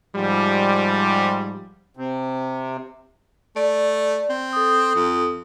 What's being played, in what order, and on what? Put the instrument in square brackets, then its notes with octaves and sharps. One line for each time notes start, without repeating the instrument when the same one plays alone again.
[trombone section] G#2 F3 G3
[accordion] C3
[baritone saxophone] A3 [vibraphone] D5
[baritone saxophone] C4
[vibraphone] A4 D#6
[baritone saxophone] F2